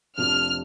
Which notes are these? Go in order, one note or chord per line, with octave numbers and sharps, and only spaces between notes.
F1 F2 F3 D4 G4 F6